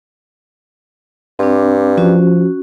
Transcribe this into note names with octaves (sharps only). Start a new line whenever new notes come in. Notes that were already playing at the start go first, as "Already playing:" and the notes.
G2 C4 D4
F3 C#4 F#4